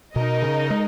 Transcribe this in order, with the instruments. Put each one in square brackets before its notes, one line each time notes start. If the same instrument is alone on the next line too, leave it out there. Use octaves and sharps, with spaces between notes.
[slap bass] B2 [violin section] D#4 A#4 D#5
[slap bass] C#3
G#3